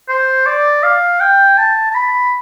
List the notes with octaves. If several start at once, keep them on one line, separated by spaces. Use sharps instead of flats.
C5
D5
F5
G5
A5
A5
B5